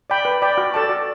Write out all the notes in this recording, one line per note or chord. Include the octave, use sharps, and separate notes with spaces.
D5 G5 B5
B4
D5 G5 B5
F#4
A4 D5 A5
F#4